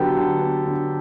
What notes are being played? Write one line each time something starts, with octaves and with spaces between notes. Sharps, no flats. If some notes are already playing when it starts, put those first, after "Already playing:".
Already playing: D3 F#3 B3 G4 A4
D3
B3
D3